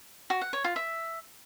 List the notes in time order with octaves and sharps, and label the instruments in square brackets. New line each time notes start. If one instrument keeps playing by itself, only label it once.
[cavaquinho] F#4
F#5
C#5
F4
E5